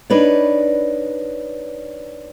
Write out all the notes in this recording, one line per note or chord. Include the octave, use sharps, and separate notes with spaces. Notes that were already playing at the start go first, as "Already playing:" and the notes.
D4 D#4 B4 C#5 D5